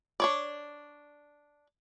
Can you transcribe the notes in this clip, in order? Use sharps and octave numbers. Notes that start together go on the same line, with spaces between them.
D4 C#5 D5